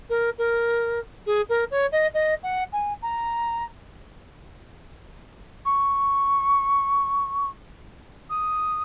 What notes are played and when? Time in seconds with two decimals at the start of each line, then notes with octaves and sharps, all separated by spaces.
0.09 A#4
0.38 A#4
1.26 G#4
1.49 A#4
1.71 C#5
1.92 D#5
2.14 D#5
2.43 F#5
2.72 G#5
3.02 A#5
5.65 C#6
8.30 D#6